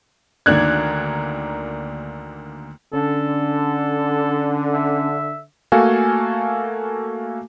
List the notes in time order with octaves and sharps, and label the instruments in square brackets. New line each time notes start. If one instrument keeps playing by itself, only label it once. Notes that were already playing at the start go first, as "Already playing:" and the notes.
[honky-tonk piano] D2 D#3 A#3 D4 F#6 G#6
[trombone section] D3 [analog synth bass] C#4 [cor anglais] A4
[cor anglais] E5
[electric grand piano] A3 A#3 F#4 A4 F5 G#5